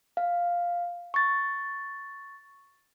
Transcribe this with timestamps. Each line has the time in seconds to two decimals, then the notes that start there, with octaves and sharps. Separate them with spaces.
0.17 F5
1.14 C#6 A6